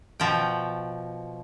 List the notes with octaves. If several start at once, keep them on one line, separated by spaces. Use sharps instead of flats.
B2 F3 G5